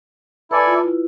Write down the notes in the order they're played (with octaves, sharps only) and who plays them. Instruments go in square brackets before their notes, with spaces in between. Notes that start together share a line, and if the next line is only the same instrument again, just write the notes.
[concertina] E4 A4 D5 G#5 [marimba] B4
[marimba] F4
E4